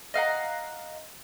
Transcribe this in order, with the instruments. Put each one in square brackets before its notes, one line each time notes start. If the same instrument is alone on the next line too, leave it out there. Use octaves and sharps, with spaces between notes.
[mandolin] D#5 F5 F#5 A#5